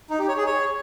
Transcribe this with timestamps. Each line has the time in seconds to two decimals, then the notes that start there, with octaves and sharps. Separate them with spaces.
0.10 D#4
0.19 G4
0.28 C#5
0.37 G#4
0.46 C#5